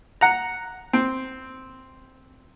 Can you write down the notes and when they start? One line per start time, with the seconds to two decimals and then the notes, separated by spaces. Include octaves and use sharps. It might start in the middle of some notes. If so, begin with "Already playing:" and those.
0.21 F#5 A#5
0.93 C4